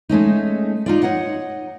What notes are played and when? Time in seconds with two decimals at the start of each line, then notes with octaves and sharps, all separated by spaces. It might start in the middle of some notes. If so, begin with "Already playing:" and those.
0.09 G#3 A3 C#4 D#4
0.86 D#4 F4 D5
1.03 D#4 C#5 D#5 F#5